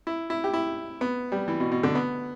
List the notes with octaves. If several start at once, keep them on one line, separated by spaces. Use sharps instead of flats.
E4
E4
G4
E4
B3
G3
E3
B2
B2
D3
B3